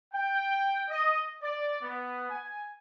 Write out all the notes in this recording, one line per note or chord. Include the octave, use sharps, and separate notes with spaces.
G5
D#5
D5
B3
G#5